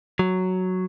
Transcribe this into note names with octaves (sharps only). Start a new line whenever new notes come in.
F#3